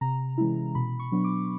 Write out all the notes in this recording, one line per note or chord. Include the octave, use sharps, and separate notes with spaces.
C3 A#5
E3 G#3 C#4 E4
B2 B5
C#6
F#3 B3 D4
D6